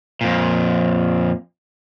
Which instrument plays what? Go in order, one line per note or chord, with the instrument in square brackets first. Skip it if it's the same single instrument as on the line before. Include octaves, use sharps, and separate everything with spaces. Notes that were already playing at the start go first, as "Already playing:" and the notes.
[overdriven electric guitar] F2 A#2